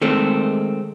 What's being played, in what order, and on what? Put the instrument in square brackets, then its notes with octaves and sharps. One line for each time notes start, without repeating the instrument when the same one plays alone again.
[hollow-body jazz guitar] D#3 G#3 A3 C4